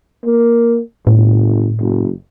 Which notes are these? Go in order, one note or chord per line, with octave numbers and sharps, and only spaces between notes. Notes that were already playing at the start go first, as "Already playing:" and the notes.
A#3
G1 A2
F#1